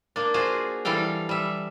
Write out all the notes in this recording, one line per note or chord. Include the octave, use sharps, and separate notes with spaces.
A#3 D4
F4 F#4 G#4 C5 F5
E3 G3 A4 F5 G5
G3 E5